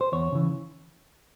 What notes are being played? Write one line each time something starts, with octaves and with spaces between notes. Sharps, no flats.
C5
E2 C#5
C#3 E3